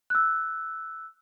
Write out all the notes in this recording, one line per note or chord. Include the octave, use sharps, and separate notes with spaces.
E6 F#6